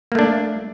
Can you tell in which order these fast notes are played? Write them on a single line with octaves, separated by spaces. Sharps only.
A#3 A3 D4